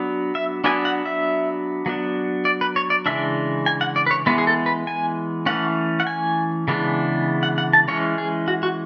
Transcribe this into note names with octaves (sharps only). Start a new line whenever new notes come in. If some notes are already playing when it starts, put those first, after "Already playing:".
Already playing: F#3 B3 D4
E5
F#3 B3 D4 G#5
F#5
E5
F#3 B3 D4
D5
B4
C#5
D5
C#3 E3 G#3 D4 E5
G#5
F#5
D5
B4
C#5
E3 G#3 B3 B4
G#4
A4
B4
G#5
E3 A3 C#4 F#5
F#5
G#5
C#3 E3 G#3 B3 D4
F#5
F#5
A5
E3 G#3 C#4 C#5
G#4
F#4
F#4